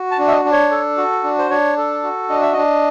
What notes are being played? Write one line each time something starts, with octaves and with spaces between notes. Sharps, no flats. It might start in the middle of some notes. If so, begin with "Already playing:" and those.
Already playing: F#4
A5
D4
E5
D#5
D4
C#5
A4
F#4
D4
C5
D4 C#5
A4
F#4
D4 D#5
E5
D4 D#5